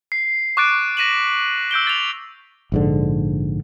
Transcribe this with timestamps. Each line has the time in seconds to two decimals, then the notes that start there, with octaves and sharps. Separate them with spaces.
0.12 C7
0.57 C#6 D6 F#6 A6 D7
0.97 A#6 B6 D#7 E7 F#7
1.71 E6 G6 D7 G7
1.87 A6 F7
2.72 A#1 G#2 D3